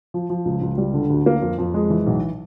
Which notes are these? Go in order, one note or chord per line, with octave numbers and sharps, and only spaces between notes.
F3
F3
C#2
C#2
G3
D3
D2
A#3
F2
F2
G#3
E3
B1